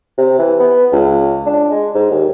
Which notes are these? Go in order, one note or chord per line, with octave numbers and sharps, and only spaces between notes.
C3
E3
B3
C#2
D4
G#3
G#2
D#2